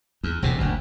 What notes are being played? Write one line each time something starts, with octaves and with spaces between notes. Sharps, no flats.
E2
E1 E2 C3
F#1 D2